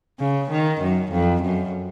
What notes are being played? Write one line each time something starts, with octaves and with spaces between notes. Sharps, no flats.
C#3
D#3
F#2
F2
F#2